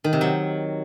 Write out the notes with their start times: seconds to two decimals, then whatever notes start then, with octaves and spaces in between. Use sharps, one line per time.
0.04 D#3
0.13 C3
0.21 F#3